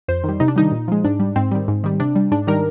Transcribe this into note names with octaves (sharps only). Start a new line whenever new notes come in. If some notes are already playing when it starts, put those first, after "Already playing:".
F2 C5
D#3 G3
C3 D#4
D4
D#3 G3 D#4
A#2
F3 G#3
G#2 D4
G3
G#2 C4
D#3 G3
G#2
D#3 G3
C3 D4
G3
G#2 D4
D#3 G3 A#4